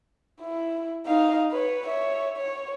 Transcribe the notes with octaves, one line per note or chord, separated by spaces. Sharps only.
E4
D#4 F5
B4 C#5
C#5 E5
C#5